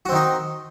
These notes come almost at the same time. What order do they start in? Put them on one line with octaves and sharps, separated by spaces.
F#4 C4 D#3 D#4